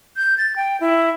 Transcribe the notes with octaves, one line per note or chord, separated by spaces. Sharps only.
G6
A6
G5
E4